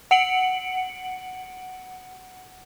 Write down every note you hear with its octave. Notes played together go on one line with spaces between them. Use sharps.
F#5 C#7 D7 F#7